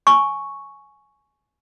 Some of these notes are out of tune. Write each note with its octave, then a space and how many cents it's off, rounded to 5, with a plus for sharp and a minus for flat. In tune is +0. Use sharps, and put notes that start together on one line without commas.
G#5 +15 C#6 +0